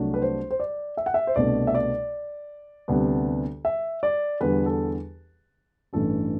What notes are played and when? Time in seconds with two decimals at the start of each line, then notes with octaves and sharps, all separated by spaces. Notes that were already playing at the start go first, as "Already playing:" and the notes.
Already playing: C2 C3 F#3 A3 D4
0.14 B4
0.22 C5
0.51 C5
0.60 D5
0.97 E5
1.06 F#5
1.14 E5
1.27 C5
1.36 C2 B2 A3 D4 D5
1.67 E5
1.75 D5
2.88 D2 C3 G3 B3 D4
3.65 E5
4.03 D5
4.41 E2 D3 G3 B4
4.66 A4
5.93 A1 G2 E3 A3 D4 A4